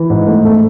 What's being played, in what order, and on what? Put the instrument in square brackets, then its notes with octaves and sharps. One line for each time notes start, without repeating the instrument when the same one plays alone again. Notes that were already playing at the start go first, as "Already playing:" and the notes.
Already playing: [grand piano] E3
G#2
A3
A3